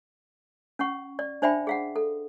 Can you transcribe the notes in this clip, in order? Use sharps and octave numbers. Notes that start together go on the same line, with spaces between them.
C#4 F#5 C#6
D5
D4 C5 D5 E5 G5 B5
G#4 F5 F#5
A4